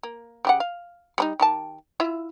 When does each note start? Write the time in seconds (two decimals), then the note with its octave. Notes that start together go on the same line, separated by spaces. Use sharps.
0.03 A#3
0.45 C#3 G4 F#5
0.60 F5
1.18 G3 D4 D#4
1.40 D#3 G4 A5
2.00 E4 F4 E5